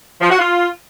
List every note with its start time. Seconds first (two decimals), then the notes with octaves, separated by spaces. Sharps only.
0.21 F3
0.30 F#4
0.39 F4